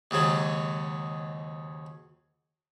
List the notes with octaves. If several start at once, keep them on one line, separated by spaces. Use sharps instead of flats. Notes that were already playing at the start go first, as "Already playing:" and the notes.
D#2 G#2 C#3 F#3